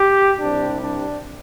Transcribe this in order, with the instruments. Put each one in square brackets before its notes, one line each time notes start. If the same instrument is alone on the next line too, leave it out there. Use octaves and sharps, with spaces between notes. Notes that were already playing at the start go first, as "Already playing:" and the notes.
Already playing: [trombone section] G4
C2 C3 G3 D4
D4